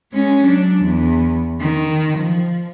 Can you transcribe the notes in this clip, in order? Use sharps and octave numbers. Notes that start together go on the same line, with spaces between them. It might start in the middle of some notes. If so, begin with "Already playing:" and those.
G#3 C#4
F#3 D4
E2
D#3
F3